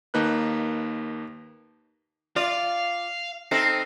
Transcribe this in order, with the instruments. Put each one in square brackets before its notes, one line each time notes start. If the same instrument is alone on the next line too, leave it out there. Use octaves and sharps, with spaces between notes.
[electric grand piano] D#2 A#3 D#4 B4 F#6
[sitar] F4 D5 [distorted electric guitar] F5
[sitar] C4 D#4 A4 [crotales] F6 A#6 C7